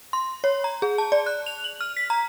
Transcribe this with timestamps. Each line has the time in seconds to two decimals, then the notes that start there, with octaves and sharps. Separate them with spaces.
0.13 C6
0.44 C#5
0.64 A#5
0.82 G#4
0.98 A5
1.12 D5
1.26 F#6
1.46 F7
1.64 F#7
1.81 F6
1.97 B6
2.10 A#5